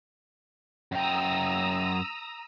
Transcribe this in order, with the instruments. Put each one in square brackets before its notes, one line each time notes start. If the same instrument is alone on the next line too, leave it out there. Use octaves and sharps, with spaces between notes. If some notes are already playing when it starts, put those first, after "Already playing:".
[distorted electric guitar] F#2 G5 [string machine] A#5 D#6 E6